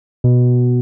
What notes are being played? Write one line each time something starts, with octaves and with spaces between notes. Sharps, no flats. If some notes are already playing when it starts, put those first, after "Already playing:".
B2